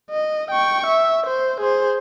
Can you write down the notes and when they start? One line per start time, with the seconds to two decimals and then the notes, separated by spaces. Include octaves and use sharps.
0.10 D#5
0.51 G5 C#6
0.87 E5
1.27 C5
1.61 G#4 C5